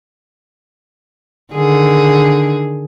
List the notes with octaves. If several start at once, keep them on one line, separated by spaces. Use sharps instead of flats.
D3 D#3 G#4